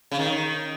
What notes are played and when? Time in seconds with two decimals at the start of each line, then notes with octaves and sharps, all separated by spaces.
0.12 C#3
0.19 D#3